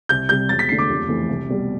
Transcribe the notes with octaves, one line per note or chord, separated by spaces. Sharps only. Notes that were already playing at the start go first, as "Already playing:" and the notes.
C2 G6
C3 G3 G6
E1 A6
B6
D2 D3 C7
D6
F1
F2 E3 A3
C2
B2 G3